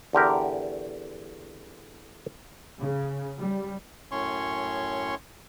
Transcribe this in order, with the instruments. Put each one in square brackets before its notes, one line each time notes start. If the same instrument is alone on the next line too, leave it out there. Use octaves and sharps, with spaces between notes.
[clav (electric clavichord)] E2 D3 G4 A#4
[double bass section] C#3
G3
[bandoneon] F#2 A2 C#4 C#5 C6 C#6